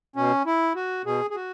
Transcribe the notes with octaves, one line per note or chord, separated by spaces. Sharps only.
B2 C#4
E4
F#4
B2 G#4
G#4
F#4